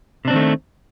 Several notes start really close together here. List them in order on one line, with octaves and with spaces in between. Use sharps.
C3 D4 C4 D#3 A3